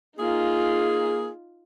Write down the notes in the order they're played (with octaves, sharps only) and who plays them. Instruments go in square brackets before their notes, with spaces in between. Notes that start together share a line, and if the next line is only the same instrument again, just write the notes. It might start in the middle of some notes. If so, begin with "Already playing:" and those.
[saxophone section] A#3 G#4 [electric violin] D#4 F4